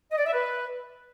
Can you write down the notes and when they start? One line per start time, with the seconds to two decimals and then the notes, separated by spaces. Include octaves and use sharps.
0.11 D#5
0.18 D5
0.26 E5
0.33 B4